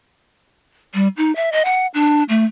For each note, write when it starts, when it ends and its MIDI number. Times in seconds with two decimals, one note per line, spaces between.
0.94 1.08 55
1.17 1.34 63
1.36 1.52 76
1.52 1.63 75
1.65 1.87 78
1.94 2.23 62
2.29 2.45 57